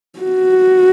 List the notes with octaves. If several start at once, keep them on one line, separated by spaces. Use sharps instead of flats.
F#4